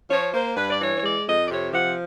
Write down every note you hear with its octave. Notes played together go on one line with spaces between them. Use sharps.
F3 C#5
A#3 C5
G2 B4
D5
E3 C#5
C#5
G#3 D5
F2 D#5
D5
C3 C#5
F3 F#5